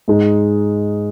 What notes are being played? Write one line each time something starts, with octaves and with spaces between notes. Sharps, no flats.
G#2 G#3 D#4